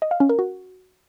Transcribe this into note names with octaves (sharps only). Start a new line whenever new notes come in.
D#5
F5
C#4
A#4
F#4